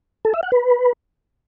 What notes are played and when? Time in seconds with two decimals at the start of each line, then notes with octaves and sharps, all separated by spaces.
0.25 A4
0.34 E5
0.43 F#5
0.52 B4